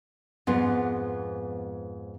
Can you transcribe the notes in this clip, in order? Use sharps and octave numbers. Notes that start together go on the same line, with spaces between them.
F2 G#2 B3 F4